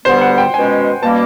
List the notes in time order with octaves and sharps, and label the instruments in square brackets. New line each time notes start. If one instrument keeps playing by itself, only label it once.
[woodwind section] G2 D3 G3 B3 [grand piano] C5
[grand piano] F#5
G5
[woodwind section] B2 G#3 C#4 [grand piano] G#5
[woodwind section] B2 G3 A#3 C#4 [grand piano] A5